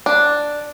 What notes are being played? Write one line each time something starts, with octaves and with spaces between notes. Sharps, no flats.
D4